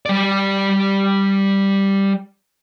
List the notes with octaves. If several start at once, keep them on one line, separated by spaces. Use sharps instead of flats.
G3 D5